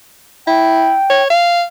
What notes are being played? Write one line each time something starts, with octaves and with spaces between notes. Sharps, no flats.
E4 G5
C#5
F5